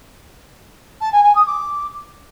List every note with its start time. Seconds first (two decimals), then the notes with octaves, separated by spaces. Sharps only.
1.01 A5
1.12 G#5
1.24 G#5
1.35 D#6
1.47 D6